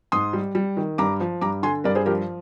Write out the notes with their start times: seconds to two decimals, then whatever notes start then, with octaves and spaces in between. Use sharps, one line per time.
0.12 G#2 C6 D#6
0.33 G3
0.55 G3
0.77 D#3
0.98 G2 A#5 D6
1.20 F3
1.41 G2 A#5 D6
1.63 D3 G#5 C6
1.84 G2 A#4 D5
1.95 G#4 C5
2.06 F3 G4 A#4